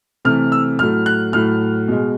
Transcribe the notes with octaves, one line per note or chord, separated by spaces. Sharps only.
C3 E3 A3 F6
E6
A2 F#3 A3 F6
F#6
A2 F#3 A3 F6
B2 G#3